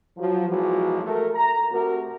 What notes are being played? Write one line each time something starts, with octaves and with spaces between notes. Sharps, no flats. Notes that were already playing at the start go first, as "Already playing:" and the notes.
F3 F#3
B1 E3 F3 G#3 F#4
A3 A#4
A#5
C3 A3 F#4 A#4